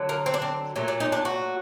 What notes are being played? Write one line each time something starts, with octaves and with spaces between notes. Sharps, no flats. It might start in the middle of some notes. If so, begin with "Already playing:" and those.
Already playing: D3 F#3
A#3
C4
D4
C4
A#2 F#3 A3
D4
D#4
D4
F#4